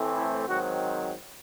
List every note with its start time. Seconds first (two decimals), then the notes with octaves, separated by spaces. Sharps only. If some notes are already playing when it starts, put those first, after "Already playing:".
Already playing: A2 E3 A3 C4
0.15 E4
0.47 G#2 D#3 F#3 C4 F#4